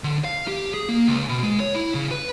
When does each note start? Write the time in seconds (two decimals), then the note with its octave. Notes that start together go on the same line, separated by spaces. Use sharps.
0.04 D3
0.24 F5
0.48 G4
0.74 G#4
0.89 A#3
1.08 C#2
1.29 B2
1.43 G#3
1.60 C#5
1.75 E4
1.95 C#3
2.11 B4